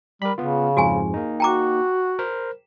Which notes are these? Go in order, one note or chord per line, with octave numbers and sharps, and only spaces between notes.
G3 A#4 B5
C#3 B3 F4
F2 G#2 F3 F#4 G#4 G#5
A#3 D#4
F#4 G5 A#5 D6
A#4 C5